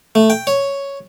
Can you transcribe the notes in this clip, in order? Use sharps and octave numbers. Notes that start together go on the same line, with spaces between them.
A3
G5
C#5